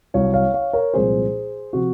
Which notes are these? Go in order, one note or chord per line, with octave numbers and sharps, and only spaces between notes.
C2 C3 F#3 C#5 F5
C#5 F5
C#5 F5
A#4 C#5
C2 A#2 F3 G#3 C4 G#4 C5
C3 F3 F#4